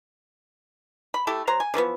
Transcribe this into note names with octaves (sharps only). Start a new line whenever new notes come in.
B5
A3 E4 G4 A4
F#3 C5 A#5
G#5
D3 E3 F3 B3